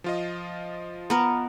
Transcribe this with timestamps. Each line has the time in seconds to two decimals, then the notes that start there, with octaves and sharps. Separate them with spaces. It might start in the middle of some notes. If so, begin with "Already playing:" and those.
0.04 F3 F4 D#5
1.10 B3 A#4